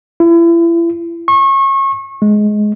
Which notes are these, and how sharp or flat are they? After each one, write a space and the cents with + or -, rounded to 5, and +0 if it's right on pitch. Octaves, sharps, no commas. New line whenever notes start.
E4 +35
C#6 -30
G#3 +15